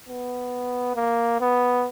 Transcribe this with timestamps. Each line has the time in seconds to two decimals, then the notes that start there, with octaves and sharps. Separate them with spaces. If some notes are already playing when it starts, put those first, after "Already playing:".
0.09 B3
0.96 A#3
1.41 B3